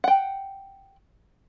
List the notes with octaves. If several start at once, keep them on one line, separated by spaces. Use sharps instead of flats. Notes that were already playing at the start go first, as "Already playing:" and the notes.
F#5 G5